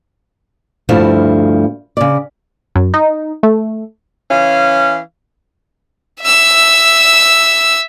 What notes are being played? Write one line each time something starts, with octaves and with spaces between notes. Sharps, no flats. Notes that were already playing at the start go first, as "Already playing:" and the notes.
D2 G2 F3 A3 E4 F4
C#3 D5
F#2
D#4
A3
E3 C#4 F5
E5 E6